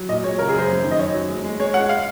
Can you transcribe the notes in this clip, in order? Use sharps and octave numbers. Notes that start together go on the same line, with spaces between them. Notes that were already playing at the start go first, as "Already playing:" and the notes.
Already playing: F#3
A#2 D#5
G#3 C#5
C#3 A#4
G#4
F#2 C5
F2
D#3
D#5
F#2 C#5
F#3
G#3
G#3
G#3 C#5
G#3 F#5
F5